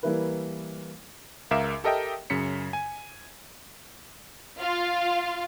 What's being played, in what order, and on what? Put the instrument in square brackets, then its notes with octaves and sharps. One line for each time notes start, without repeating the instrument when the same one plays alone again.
[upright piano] E3 G3 A#3 E4 A#4 B4
[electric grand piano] C#2 A#4 E5 F5 D6 E7
G4 A4 A#4 D#5 E5 G5
F#2 C#3 B6 C#7
G#5
[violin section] F4 F5